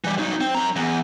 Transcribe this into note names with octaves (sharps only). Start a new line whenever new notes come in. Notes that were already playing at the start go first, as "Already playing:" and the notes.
E3 G3
F#3 D#4
C4
F#2 A#5
E2